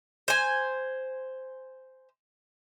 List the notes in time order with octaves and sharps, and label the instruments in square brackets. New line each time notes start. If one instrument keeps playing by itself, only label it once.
[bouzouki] C5 G#5